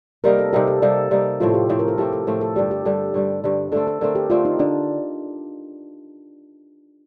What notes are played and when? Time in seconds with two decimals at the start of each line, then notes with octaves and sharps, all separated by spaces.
0.24 C3 G3 A#3 D#4 A#4
0.39 A4
0.53 C3 G3 A#3 D#4 G4
0.67 A4
0.82 C3 G3 A#3 D#4 A4
1.11 C3 G3 A#3 D#4
1.40 A2 F3 A3 C4 F4
1.49 A4
1.54 G4
1.69 A2 F3 A3 C4 A4
1.79 A#4
1.88 A4
1.98 A2 F3 A3 C4 G4
2.13 A4
2.27 A2 F3 A3 C4 A4
2.41 A4
2.56 G2 D3 G3 G4
2.71 G4
2.85 G2 D3 G3 A4
3.14 G2 D3 G3
3.44 G2 D3 G3
3.72 D3 A3 C4 A4
3.87 A4
4.01 D3 A3 C4 A#4
4.15 G4
4.30 D3 A3 C4 F4
4.45 D#4
4.59 D3 D4